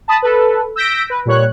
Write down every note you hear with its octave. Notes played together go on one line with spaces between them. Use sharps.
A5 B5 D#6
A4 B4
E6 G6 A#6 B6 D7
B4
A#2 G3 C#5 F#6